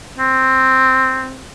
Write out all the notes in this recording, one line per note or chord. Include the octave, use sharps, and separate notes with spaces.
C4